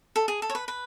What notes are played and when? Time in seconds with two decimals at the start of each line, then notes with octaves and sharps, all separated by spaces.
0.16 A4
0.28 G#4
0.42 A4
0.50 C#5
0.55 B4
0.68 B4